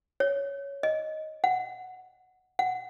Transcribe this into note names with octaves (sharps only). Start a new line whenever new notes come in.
C#5
D#5
F#5
F#5